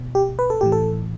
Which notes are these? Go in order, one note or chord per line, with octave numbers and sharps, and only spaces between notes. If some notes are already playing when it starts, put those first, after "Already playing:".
Already playing: B2
G4
B4
A4
A2 E3 G4
A4